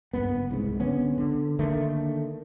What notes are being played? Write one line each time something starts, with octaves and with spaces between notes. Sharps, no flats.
F#1 G2 B3
C2 G#2
D3 B3 C#4
D3
D3 D#3 A3 A#3